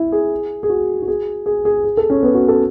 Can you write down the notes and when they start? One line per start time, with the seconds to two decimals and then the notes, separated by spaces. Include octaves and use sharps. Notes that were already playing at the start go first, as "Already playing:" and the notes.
Already playing: E4
0.12 G#4
0.63 G#4
0.69 F#4
1.02 F#4
1.08 G#4
1.46 G#4
1.65 G#4
1.84 G#4
1.97 A4
2.10 C#4
2.23 B3
2.35 F#4
2.48 A4